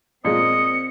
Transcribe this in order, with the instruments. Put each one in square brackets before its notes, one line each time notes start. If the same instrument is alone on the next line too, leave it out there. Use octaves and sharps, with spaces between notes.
[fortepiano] A#2 G#3 [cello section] C4 [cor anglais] D#5 [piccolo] C#7